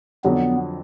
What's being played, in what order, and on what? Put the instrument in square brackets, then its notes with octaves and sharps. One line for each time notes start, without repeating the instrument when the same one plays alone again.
[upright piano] F2 D3 F#3 [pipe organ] B3